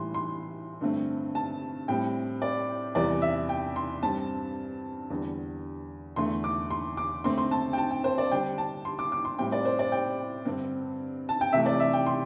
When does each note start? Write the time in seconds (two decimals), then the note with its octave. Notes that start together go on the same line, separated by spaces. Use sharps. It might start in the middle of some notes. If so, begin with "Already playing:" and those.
Already playing: A2 E3 G3 C6
0.14 C6
0.81 G2 D3 A3 C4
1.35 A5
1.88 A2 G3 C4 G5
2.42 D5
2.95 E2 C3 E3 G3 D5
3.22 E5
3.49 G5
3.76 C6
4.02 G2 G3 C4 A5
5.10 E2 D3 G3
6.16 E2 D3 A3 C6
6.44 D6
6.70 C6
6.97 D6
7.24 D3 A3 C4 C6
7.38 C6
7.51 A5
7.73 G5
7.78 A5
7.91 G5
8.04 C5
8.18 D5
8.31 D3 G3 D4 G5
8.58 A5
8.85 C6
8.99 D6
9.12 D6
9.25 C6
9.39 A2 G3 C4 G5
9.52 D5
9.65 C5
9.79 D5
9.92 G5
10.45 G2 D3 C4
11.29 A5
11.41 G5
11.53 C3 E3 A3 E5
11.66 D5
11.80 E5
11.93 G5
12.06 C6